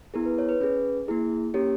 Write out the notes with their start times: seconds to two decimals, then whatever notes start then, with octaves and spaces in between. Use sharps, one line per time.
0.14 B3 E4 G#4 A#4
0.25 B4
0.38 C#5
0.49 B4
0.60 C#4 G#4 B4
1.08 A#3 E4 G#4
1.54 A#3 C#4 G4 A#4 C#5